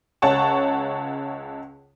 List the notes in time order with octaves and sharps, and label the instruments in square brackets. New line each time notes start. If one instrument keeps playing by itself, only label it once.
[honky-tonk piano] C#2 C#5 F#5 A5 C#6